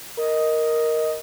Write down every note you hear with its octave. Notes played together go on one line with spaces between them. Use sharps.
A#4 D#5